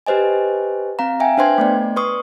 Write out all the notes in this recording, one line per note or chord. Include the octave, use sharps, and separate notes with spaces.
G4 B4 C5 D#5 G#5
C4 F5 A#5
E5 G5 G#5
D4 B4 C5 G5 C6 G#6
A3 B3 D5
B4 C6 C#6 D#6